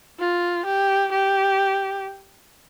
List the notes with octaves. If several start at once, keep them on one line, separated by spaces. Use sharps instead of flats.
F4
G4
G4